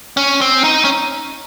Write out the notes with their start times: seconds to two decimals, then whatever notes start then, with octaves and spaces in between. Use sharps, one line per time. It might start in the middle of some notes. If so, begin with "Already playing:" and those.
0.17 C#4
0.41 C4
0.64 D#4
0.85 C#4